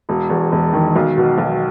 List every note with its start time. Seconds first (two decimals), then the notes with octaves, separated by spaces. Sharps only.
0.09 E1
0.30 E2
0.52 E1
0.73 D#3
0.96 B1
1.17 B2
1.38 B1